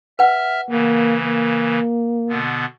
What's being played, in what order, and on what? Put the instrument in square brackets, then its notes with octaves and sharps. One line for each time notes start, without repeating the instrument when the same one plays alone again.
[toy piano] B4 F#5 [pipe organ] E5 F6
[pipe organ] C#3 E3 [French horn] A#3
[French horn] A#3
[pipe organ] B2 D3 B3